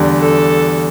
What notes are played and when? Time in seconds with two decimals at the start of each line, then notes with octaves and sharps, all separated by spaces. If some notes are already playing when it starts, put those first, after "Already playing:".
Already playing: E2 D3 G3 D4
0.19 A4